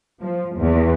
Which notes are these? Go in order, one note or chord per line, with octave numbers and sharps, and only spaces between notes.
F3
E2